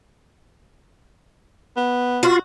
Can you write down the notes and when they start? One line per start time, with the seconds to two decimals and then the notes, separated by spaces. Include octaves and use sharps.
1.77 B3
2.23 F4 F#4